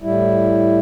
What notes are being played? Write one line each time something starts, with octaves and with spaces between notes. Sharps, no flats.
A2 G3 E4